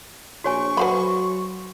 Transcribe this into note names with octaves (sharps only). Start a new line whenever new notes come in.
A#1 F#4 C#5 G#5 C#6
F#3 F#4 B4 C5 F#5 B5 C6